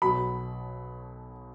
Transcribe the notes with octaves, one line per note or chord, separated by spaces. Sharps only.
B1 B2 F#3 B5